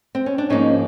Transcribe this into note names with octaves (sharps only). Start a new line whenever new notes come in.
C4
C#4
D4
G#2 F3 A#3 C#4 D#4